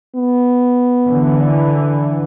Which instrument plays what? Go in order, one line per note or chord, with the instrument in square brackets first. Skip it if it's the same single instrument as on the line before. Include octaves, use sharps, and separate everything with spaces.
[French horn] B3
[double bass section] D3 E3